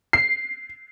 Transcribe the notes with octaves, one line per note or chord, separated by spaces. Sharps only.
C7